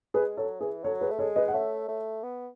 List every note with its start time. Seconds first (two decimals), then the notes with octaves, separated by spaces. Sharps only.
0.14 G#3 G#4 B4
0.37 F#3 A4 C#5
0.61 E3 G#4 B4
0.84 F#3 A4 C#5
1.01 G#4 B4
1.10 A3
1.19 G#3 A4 C#5
1.36 B4 D#5
1.48 F#5
1.54 A3 C#5 E5
1.88 A3
2.23 B3